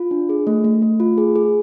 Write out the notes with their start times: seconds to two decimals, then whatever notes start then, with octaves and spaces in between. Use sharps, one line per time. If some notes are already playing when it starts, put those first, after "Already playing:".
Already playing: F4
0.11 D4
0.29 G#4
0.47 A3
0.64 A3
0.82 A3
1.00 F4
1.18 G#4
1.36 G#4